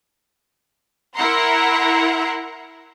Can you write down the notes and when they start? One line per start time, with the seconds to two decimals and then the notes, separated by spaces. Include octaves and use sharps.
1.15 E4 A#4 E5 F#5 A#5 C6